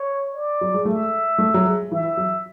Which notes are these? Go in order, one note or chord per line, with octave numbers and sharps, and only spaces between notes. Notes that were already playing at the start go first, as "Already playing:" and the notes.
Already playing: C#5
D5
F#3
G#3
A3 E5
A3
F#3
G#3
E3 E5
F#3